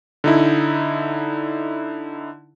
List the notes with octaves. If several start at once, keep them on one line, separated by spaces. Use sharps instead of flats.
D3 D#4 E4